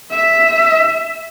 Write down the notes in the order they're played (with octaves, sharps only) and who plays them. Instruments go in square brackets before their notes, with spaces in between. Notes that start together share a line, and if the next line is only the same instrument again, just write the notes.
[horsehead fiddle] E5